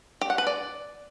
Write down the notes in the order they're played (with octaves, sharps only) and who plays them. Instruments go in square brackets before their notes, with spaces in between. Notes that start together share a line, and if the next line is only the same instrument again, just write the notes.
[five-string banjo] G4
F#5
B4
D5